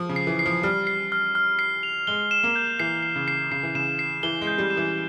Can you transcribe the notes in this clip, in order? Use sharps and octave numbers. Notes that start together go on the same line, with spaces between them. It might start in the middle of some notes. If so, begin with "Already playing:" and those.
Already playing: F3
C#3
C7
E3
C7
F3
G3 F6
C7
F6
F6
C7
F7
G#3 G7
E7
A#3
G6
E3 C7
C7
C#3
C7
C#3 C7
E3
C#3 E7
C7
E3 G7
G#3
G6
G3
E7
E3